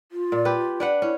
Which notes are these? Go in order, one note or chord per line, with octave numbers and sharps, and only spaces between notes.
F4
A#2
G4 B4
D4 B4 F#5
C#4 E4